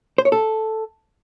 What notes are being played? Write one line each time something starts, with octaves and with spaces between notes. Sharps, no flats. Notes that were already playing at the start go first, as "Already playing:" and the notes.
C5
C#5
A4